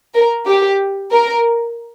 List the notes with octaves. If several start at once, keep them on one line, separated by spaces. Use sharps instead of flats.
A#4
G4
A#4